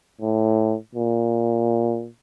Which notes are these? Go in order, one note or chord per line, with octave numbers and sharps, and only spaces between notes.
A2
A#2